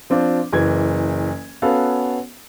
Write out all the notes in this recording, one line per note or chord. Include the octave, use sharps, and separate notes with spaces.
F3 C4 D4 F4
F#1 E3 G#6
B3 C#4 F#4 A4 F5